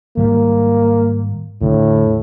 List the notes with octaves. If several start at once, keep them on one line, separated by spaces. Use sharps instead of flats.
G#2 D#3 G3 A#3
E2 A2 D3 D4